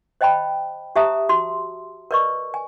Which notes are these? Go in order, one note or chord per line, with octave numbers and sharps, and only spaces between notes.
C5 D#5 G5 A5 B5
G4 C5 E5 A5 A#5 D#6
F#4 C6
A#4 B4 D5 D#5 C#6
G#5